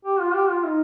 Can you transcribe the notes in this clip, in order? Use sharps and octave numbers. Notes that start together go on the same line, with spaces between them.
G4
F4
G4
F4
D#4